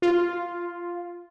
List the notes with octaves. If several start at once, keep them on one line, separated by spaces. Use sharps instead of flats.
F4